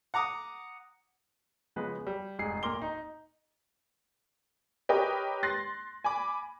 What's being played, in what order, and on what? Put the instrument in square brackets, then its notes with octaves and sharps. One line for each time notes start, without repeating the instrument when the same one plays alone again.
[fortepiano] F#5 A#5 D6 D#6
[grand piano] C#3 F3 G#3 B3 B4
G3
F1 G#2 G#4 C7
D1 A#2 A#4 C6 D6 G7
D#4
[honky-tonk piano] G4 A#4 B4 C#5 D#5
C6 F#6 A6 A#6 C7
G#5 B5 D6